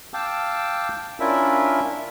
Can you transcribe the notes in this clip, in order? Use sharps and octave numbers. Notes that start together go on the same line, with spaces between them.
F5 G5 A5 D6 E6
C#4 D4 E4 F4 A#4 E5